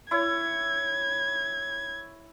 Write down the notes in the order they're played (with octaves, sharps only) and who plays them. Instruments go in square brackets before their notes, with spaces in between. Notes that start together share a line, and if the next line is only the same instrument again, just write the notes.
[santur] E4 C#5 [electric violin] G#6